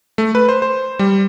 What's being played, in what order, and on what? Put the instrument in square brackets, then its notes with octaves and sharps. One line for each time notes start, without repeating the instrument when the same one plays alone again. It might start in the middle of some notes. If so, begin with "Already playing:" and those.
[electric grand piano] A3
B4
C5
C5
G3